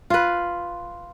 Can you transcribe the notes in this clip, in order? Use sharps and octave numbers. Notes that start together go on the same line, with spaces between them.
F4 B4